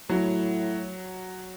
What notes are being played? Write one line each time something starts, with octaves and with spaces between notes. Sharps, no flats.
A2 F#3